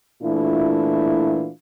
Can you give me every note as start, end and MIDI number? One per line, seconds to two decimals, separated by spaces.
0.23 1.49 46
0.23 1.49 52
0.23 1.49 57
0.23 1.49 62
0.23 1.49 64
0.23 1.49 65